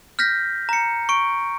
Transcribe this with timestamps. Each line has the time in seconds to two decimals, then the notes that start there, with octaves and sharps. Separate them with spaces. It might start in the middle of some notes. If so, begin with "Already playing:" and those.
0.19 F6 G6 A#6 B6
0.69 A#5 C#7
1.09 C#6 D7